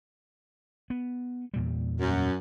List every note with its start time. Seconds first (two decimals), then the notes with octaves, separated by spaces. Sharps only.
0.90 B3
1.54 E2 A#2 G3
2.01 F#2